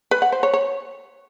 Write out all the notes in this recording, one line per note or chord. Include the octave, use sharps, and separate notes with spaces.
B4
F#5
C5
C#5
C#5